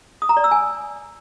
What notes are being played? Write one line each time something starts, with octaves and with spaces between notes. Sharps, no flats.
D#6
A#5
D5
E6
G#5